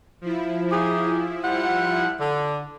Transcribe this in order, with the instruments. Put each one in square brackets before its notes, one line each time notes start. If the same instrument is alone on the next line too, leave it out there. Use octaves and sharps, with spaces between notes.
[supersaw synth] F3 E4
[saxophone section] D#4 G4 G#4
G3 F4 F#5
D3